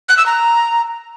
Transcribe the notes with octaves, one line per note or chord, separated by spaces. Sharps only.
F#6
E6
A#5